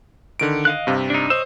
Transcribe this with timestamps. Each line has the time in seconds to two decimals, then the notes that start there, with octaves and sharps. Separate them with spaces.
0.40 D3 D#3 D7
0.65 D#5 F5 F#6
0.87 G2 C3
1.10 D4 D#4
1.30 C5 C#5 D#5 E6